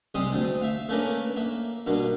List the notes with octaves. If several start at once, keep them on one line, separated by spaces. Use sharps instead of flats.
C3 G3 G#3 C4 D#6
D2 D4
E5 F5
A3 A#3 C#4 D4 A#4 B4
A#3 E5
G2 B2 A#3